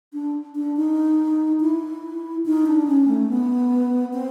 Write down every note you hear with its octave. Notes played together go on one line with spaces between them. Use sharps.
D4
D4
D#4
E4
D#4
D4
C#4
A3
B3
C4